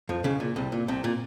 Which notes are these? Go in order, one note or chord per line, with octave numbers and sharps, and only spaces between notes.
F2 F3
C#2 C#3
A#2
C2 C3
A#2
C2 C3
A#2